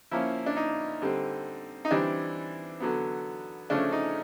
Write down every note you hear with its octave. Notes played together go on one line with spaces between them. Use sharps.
F3 A#3 C#4 E4
D4
D#4
D3 G3 C4
D#4
E3 G3 C4 D4
D3 F#3 B3
C#3 F3 A3 C#4 D4
D#4